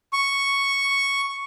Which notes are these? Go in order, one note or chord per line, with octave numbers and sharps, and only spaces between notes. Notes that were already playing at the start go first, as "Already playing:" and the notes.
C#6